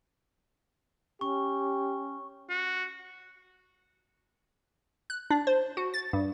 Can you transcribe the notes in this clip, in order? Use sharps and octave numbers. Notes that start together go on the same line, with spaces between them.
C#4 G4 C#6
F#4
F#6
D4
C5
F#4
A6
G2